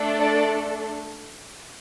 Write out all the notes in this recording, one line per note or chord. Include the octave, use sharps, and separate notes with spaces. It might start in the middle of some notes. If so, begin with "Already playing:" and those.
Already playing: A3 D4 A4
D5